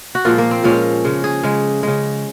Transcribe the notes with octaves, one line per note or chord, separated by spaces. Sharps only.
F#4
A#2 F3 G#3 F4
A#3
C4
A#2 F3 G#3 C#4
C#3 G#3
G#4
C#3 G#3
C#3 G#3